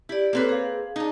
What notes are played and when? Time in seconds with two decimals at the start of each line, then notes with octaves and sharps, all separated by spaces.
0.09 E4 G4 D5
0.33 A#3 C4 G#4 A4 B4 C#5
0.49 G#4 F5
0.96 D4 D#4